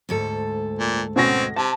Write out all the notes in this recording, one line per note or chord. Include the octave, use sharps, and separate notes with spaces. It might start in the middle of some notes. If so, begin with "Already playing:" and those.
D2 G#2 A4
A#2
B2 C4 C#4 A#6
C3 A5